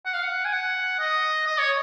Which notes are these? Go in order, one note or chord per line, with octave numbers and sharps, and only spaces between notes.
F#5
F5
F#5
G#5
F#5
D#5
D#5
C#5